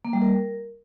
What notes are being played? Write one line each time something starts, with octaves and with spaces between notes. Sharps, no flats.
A#3
G3
A#4